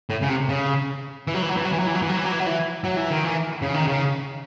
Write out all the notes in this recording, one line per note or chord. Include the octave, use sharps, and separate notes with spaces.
A2
C#3
C3
C#3
E3
F#3
E3
F#3
E3
F#3
E3
F#3
E3
F#3
E3
F#3
E3
F#3
E3
F#3
E3
F#3
E3
D#3
E3
C#3
D#3
C#3